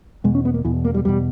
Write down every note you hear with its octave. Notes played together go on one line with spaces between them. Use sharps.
E2 B2 G#3
C#4
B3
A#3
E2 B2 E3
A#3
G3
E2 B2 G3